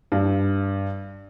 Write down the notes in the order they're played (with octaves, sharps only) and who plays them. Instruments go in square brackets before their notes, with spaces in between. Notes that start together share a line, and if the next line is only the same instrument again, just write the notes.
[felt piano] G2